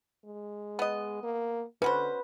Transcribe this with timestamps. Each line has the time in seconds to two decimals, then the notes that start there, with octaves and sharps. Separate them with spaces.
0.25 G#3
0.79 B3 D#5
1.23 A#3
1.82 D3 C#4 F#4 B4 C5